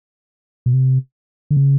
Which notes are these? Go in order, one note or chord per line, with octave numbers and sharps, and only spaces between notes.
B2
C3
D3
C#3